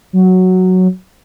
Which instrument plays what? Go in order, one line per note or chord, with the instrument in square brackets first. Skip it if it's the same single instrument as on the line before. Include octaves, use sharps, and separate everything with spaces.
[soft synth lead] F#3